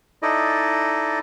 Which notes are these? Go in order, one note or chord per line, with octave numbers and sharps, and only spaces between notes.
D#4 E4 A4 D5 D#5